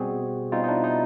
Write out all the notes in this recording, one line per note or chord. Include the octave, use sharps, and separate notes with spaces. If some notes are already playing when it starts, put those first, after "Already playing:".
Already playing: B2 G3 C4 F#4 G#4
B2 G3 C4 D#4 F4
D#4
D4 E4
D#4